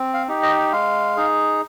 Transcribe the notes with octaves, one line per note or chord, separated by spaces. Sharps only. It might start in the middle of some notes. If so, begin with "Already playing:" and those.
Already playing: C4
F5
D#4 G4
D#5
G#3 F5
D#4 G#4